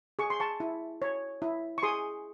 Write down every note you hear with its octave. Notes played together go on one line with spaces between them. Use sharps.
G#4 C#6
C6
A5 C#6
E4
C#5
E4
C#6
G#4 C6 D#6